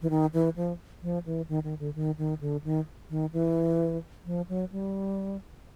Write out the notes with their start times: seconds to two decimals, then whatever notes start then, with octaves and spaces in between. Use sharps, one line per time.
0.02 E3
0.10 D#3
0.33 E3
0.56 F3
1.03 F3
1.26 E3
1.49 D#3
1.64 D#3
1.79 D3
1.95 D#3
2.18 D#3
2.41 D3
2.64 D#3
3.10 D#3
3.33 E3
4.26 F3
4.49 F#3
4.72 G3